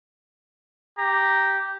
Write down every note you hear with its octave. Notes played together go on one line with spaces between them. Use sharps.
G4 A#5